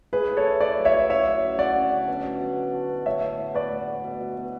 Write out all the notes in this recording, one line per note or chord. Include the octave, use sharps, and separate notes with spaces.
A2 G#4 B4
E4
A4 C#5
E4
A2 B4 D5
F#3
C#5 E5
E4
C#4 C#5 E5
F#3
F#3
D3 D5 F#5
C#4
D3
B2
B2
B2
D4
F#4
B2
A2 C#5 E5
B3
A2
B3 B4 D5
A2
A2
B2
B2
B2